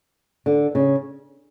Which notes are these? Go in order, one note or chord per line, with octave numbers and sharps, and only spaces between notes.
D3
C#3